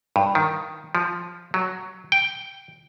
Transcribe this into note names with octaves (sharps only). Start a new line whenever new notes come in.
G2
D#3
F3
F#3
G5